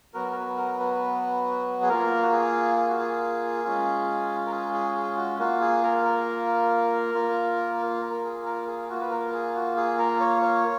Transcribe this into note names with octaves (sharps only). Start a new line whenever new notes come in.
F#3 B3 F#4 A#4
A#4
B4
A#4
B4
G#4
A#3 F4 A#4
F#4
G#4
G#4
F#4
G#4
G#3 C#4 F4
A#4
G#4
G#4
G#4
F#4
A#3 F4 F#4
G#4
A#4
A#4
A#3 F4
A#4
A#4
G#4
A#4
G#4
A#3 F4 F#4
B4
A#4
G#4
F#4
G#4
A#4
C#5
C#5